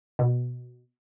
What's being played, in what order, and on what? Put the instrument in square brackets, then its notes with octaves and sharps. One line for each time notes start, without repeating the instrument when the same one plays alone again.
[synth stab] B2